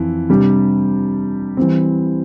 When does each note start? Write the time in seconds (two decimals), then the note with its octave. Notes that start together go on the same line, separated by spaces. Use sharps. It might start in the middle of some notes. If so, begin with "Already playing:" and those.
Already playing: F2 E3
0.29 C3 G3 D4 G4
1.57 E3 G3 C4